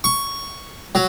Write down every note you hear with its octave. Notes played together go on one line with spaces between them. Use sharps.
C#6
F#3